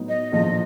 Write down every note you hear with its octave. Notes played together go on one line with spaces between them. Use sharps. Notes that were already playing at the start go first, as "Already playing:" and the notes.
Already playing: A2 F#3 B3 D#4
D#5
A#1 A2 F3 D#5